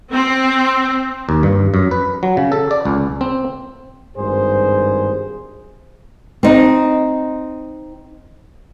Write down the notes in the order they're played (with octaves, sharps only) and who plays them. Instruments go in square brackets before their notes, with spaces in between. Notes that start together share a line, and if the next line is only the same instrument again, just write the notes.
[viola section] C4
[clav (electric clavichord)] D#2
G2
F#2
B4
F#3
C#3
A4
D5
C#2
C4
[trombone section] G#1 G2 G#4 C5
[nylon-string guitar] C4 D#4